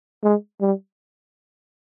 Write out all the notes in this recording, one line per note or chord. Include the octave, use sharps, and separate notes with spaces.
G#3
G3